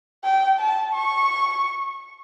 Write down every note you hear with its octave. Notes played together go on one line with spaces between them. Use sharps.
G5
A5
C#6